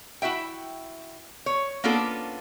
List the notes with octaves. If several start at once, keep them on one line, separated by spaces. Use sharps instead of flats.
E4 F#4 E5 G5
C#5
A#3 B3 C#4 D4 F4 A4